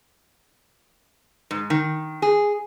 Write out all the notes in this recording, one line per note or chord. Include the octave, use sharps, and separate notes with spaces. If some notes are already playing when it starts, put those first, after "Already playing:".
G#2
D#3
G#4